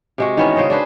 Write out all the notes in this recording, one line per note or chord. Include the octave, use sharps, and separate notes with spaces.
C3 G#3 F#4
D#3 E3 B3 C#4
C#3 C5 C#5 D#5
D4 G#4 B4 C5